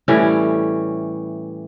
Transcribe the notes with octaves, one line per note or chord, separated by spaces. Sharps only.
A2 E3 G3 C#4